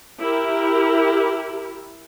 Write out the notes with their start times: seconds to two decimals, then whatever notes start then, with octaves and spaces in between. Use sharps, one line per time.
0.18 E4 G4 A#4